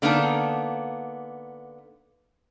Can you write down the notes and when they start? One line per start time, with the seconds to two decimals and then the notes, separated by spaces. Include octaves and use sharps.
0.02 D3 A#3 B3 D#4 A5